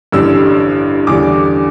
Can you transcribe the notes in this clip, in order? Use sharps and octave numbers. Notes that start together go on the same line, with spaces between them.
A1 G2 D3 G3 E6
E2 D3 G3 D6